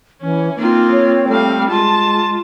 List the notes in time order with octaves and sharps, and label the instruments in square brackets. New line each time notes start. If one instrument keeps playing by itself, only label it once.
[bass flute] E3 [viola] C#4
[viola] A#3 F4 [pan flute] C4 [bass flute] D#4
[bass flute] C#5
[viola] G3 F5 [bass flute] A3
[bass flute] G#3 [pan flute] F4 [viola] A5